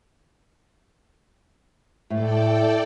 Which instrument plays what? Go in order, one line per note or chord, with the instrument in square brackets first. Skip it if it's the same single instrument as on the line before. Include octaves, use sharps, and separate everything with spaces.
[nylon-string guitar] A2 [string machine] A4 D5 G5